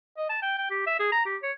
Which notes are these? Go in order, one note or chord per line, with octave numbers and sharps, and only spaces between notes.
D#5
A5
G5
G5
G4
E5
G#4
A#5
G4
C#5